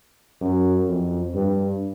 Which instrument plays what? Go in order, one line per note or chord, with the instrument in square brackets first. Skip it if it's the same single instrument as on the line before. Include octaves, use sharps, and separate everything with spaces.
[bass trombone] F#2
F2
G2